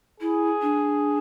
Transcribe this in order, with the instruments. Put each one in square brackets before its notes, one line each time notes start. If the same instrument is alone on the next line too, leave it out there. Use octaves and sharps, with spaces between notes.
[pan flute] E4 [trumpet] G#4
[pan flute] D4